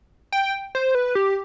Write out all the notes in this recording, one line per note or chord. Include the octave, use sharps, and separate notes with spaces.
G5
C5
B4
G4